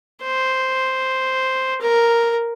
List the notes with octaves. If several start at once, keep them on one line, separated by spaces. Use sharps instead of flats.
C5
A#4